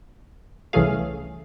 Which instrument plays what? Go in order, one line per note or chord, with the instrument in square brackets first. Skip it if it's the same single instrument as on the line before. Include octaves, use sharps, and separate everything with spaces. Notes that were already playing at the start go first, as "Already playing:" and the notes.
[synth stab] C2 E3 A3 C#4 G#4 F5